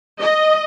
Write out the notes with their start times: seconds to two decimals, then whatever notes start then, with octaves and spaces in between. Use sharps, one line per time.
0.20 D#5